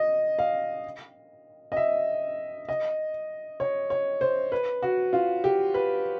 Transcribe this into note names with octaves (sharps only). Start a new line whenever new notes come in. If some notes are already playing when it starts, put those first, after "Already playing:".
Already playing: D#5
F5
D#5
E5
D#5
C#5
C#5
C5
B4
F#4
F4
G4
B4